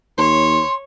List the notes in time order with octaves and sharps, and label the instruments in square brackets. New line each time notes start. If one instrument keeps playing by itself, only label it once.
[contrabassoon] D#2 [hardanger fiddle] C#5 [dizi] C6